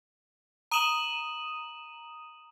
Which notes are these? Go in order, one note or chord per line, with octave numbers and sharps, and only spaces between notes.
A#5 D#6 D#7 E7 F#7